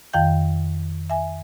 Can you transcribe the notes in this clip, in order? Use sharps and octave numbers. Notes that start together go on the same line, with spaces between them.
F2 D#3 F5 G5 G6
E5 G#5